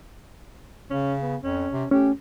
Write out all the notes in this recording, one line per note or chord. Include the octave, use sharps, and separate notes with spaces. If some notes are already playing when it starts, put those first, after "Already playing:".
C#3 C#4
B3
F2 C#4
C3
A3 C#4 G4